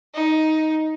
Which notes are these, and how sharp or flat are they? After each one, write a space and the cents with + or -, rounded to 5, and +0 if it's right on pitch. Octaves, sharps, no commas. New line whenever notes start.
D#4 +10